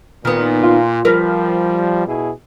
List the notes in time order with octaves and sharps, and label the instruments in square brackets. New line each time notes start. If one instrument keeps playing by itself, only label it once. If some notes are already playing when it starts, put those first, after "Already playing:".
[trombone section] A#2 [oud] D#3 B3
[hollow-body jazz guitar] F4
[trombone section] F3 G3 [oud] A#4 B4
[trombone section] B2 E4 G#4